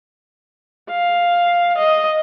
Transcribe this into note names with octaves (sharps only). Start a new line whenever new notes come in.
F5
D#5